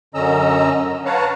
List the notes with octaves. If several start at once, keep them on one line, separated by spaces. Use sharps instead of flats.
F#2 D3 C#4 D#5 A#5 E6
B4 C#5 F5 F#5 A5 A#5